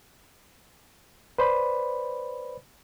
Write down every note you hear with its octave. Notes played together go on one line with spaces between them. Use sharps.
B4 C5 D5 B5